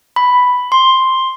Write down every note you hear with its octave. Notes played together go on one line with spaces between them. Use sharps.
B5
C6